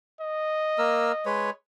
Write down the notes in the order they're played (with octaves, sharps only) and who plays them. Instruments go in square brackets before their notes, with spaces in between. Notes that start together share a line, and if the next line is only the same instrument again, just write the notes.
[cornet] D#5
[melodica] A#3 A#4 E6
G#3 B4 C#5